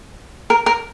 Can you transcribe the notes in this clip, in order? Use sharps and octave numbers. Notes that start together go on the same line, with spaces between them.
A#4
A#4